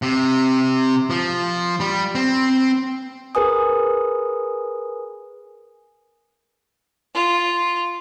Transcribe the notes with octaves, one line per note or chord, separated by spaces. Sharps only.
C3
F3
G3
C4
G#4 A#4 B4 G#5 D#6
F4